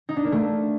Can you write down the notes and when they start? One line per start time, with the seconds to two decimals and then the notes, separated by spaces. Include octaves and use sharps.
0.09 D#4
0.17 D4
0.24 A#3
0.32 A3